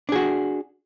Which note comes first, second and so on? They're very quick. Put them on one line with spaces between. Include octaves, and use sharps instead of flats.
D4 G#4 F#4